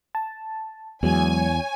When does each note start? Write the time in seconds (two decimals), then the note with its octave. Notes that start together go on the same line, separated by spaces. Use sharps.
0.15 A5
1.03 E2 F#3 G#3 C#5 G#5